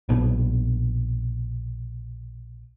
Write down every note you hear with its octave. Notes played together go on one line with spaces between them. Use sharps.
A#1 B2